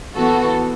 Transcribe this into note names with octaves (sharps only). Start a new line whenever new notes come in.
E3 B3 F#4 A4